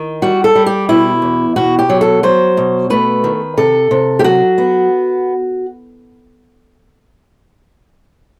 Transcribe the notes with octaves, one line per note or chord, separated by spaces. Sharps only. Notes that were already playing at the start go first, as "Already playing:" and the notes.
Already playing: D#3
G3 F#4
A4
G3
G4
B2 E4
E2
B2 F#4
G4
F#3
A4
F#3 C5
B2
A3 B4
D#3
C3 A4
C3
G4
F#3 F#4
B3